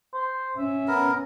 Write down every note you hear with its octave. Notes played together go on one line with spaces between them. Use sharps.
C5
C#4 E5
B3 A#4